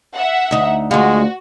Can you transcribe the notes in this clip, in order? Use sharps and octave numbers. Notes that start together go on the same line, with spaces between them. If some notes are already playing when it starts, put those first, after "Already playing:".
E5 F#5
D2 D#4
D2 G#3 F4 F#4